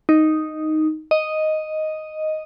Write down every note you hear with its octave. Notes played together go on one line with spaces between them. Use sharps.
D#4
D#5